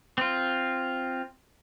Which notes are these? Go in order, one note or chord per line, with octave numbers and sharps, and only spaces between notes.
C4 F4